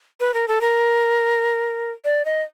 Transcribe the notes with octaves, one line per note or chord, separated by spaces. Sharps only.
B4
A#4
A4
A#4
D5
D#5